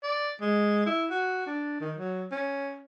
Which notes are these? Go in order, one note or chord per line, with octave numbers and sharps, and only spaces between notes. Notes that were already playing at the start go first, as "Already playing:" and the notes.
D5
G#3
E4
F#4
D4
D#3
F#3
C#4